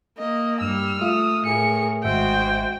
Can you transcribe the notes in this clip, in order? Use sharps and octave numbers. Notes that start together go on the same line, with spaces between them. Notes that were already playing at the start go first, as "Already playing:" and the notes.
A#3 D#5
G2 G3 E6 F6
A3 F4 D#6
A2 G#4 A#4 C#7
G#1 G#3 F#4 C5 E5 G5